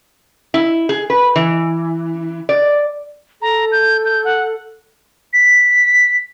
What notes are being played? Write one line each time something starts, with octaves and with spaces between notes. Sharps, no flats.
E4
G#4
B4
E3
D5
A4 A#5
G6
G6
F#5
B6